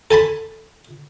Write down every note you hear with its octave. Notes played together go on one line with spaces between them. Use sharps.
A4 G#5 A5 B5